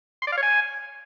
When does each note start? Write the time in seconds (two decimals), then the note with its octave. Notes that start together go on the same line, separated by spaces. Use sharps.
0.22 C6
0.27 D5
0.32 F5
0.38 C#5
0.43 G#5